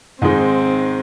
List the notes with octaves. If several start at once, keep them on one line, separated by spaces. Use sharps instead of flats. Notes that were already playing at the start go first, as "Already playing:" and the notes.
G#2 D#3 G#3 C4 D#4